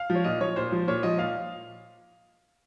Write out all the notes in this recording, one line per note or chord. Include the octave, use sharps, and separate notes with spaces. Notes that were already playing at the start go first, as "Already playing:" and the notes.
Already playing: F5
F3
C#5
A#2 D#5
F3 C#5
A#2 C5
F3
A#2 C#5
F3 D#5
A#2 F5